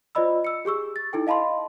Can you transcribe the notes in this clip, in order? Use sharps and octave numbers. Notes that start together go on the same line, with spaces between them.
F4 C5 D5 D#5 B5 E6
E6 C#7
G4 G#4 C#6 E6
A6
D#4 E4 A4 G5
D#5 F5 A5 B5 C6